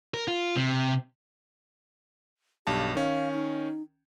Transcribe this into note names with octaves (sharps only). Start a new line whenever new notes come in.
A#4
F4
C3
B1 G2 G4 A5
D#3 C#4 F5
D#4